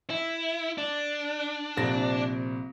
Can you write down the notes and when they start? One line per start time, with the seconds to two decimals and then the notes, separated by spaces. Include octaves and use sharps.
0.10 E4
0.78 D4
1.77 A#1 C3 A#6